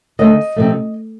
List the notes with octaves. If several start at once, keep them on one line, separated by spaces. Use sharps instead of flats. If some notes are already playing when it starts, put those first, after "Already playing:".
D2 D3 A3 D#5
C3 F3 A3